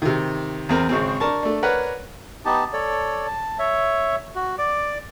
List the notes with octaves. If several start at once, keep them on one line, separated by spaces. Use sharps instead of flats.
C3 D#3
E2 C4 A#4
G#1 C#3 C4
D4 A#4 A5 C#6
A3 D4
A#4 B4 C#5 D5 F#5
B3 D#4 G4 A5
A4 C#5 D5
A5
C#5 E5
F#4
D5 D6